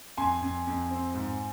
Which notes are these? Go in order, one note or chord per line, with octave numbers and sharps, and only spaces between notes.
F2 G#5 C6
F2
F2
C4
G#2